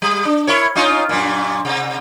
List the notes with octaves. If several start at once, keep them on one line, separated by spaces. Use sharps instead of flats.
G3
D4
E4 A#4 C#5
C#4 D#4 F4
F#2 A#2
C3